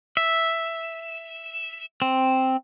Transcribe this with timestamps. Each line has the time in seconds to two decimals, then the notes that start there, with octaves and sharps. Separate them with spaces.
0.17 E5
2.02 C4